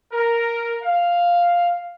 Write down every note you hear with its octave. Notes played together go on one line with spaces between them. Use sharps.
A#4
F5